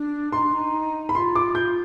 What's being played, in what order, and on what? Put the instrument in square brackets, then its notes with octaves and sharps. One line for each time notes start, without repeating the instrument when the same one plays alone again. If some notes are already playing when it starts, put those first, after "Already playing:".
Already playing: [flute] D4
[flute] D#4 [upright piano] C6
[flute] D4
D#4
[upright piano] B5
[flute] F4 [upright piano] C6
[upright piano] D6
G6